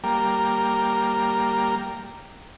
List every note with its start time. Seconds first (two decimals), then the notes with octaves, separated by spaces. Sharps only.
0.04 G3 A#3